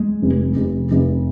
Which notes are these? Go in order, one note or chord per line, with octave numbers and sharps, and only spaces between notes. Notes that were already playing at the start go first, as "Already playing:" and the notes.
Already playing: G#3
F1
F1
F1